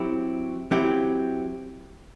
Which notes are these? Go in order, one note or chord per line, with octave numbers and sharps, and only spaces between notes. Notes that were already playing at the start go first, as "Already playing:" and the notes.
Already playing: F#3 C4 E4 G4
F#3 C4 E4 G4